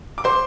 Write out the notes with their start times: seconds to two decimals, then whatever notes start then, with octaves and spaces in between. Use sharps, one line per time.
0.18 D6
0.24 C5 C6